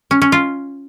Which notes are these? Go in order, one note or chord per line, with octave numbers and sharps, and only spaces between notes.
C#4
C#4
F4